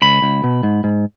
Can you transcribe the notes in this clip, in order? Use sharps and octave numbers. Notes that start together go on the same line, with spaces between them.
C#2 B5
C#2
B2
G#2
G#2